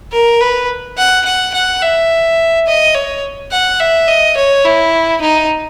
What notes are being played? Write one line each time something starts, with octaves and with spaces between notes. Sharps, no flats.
A#4
B4
F#5
F#5
F#5
E5
D#5
C#5
F#5
E5
D#5
C#5
E4
D#4